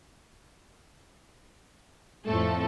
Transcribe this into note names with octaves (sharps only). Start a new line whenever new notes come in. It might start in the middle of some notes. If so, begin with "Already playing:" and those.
F2 A2 F3 A3 A4